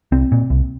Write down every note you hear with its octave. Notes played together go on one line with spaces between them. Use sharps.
C2 C4
A#2
C2